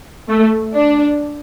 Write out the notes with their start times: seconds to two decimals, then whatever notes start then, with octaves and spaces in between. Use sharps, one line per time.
0.28 A3
0.74 D4